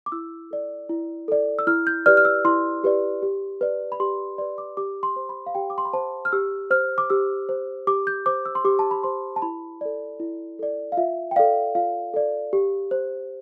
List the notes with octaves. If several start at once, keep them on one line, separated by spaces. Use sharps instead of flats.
D6
E4 E6
A4 D5
E4
A4 D5
E6
E4 F6
G6
G4 B4 D5 F6
F6
E6
E4 C6
G4 B4 D5
G4
B4 D5
B5
G4 C6
B4 D5 C6
D6
G4 D6
C6
C5
B5
F5
G4 G5
D6
C6
B5
C5 A5
F6
G4 E6
C5 F6
D6
G4 E6
C5
G4 D6
G6
C5 D6
E6
C6
G4 D6
A5
B5
C5 C6
A5
E4 B5
A4 D5
E4
A4 D5
F5
F4 E5
G5
A4 D5 F5
F4 F5
A4 D5
G4
C5